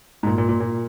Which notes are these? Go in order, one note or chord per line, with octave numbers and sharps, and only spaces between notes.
G#2
A#2
A#2
A#2
A#2